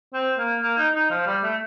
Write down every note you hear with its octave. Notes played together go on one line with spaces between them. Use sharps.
C4
A#3
A#3
D#4
D#4
F3
G3
A3